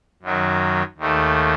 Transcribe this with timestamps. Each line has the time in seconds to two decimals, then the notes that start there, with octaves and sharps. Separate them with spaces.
0.22 F#2 D#3 F#3
0.98 D#2 D#3 A3